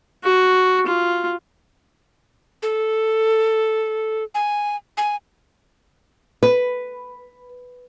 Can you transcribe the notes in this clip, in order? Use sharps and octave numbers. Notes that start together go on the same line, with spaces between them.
F#4
F4
A4
G#5
G#5
B4